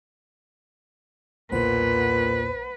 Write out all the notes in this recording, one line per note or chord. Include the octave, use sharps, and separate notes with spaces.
B1 E2 A#2 E4 B4 C5 F#5